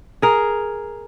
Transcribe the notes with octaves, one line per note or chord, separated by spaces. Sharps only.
G#4 A#4